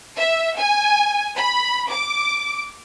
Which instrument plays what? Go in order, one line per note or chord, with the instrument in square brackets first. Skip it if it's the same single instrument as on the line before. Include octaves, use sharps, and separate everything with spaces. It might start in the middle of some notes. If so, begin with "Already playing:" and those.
[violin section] E5
G#5
B5
D6